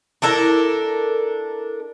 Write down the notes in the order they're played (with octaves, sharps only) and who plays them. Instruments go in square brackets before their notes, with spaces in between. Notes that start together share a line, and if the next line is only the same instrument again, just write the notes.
[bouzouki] D4 E4 A4 A#4